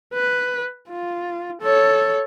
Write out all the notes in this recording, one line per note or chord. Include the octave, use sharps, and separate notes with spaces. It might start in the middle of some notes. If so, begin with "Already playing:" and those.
B4
F4
A4 C#5